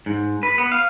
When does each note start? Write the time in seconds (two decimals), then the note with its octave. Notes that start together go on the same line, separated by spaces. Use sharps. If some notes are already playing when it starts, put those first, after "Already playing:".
0.06 G#2
0.43 B4
0.58 B3
0.72 F5